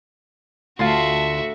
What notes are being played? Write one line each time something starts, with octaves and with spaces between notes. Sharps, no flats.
D2 F4 F#4 E5 A5 C6